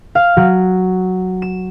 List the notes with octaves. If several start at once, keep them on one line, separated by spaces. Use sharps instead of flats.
F5
F#3
E7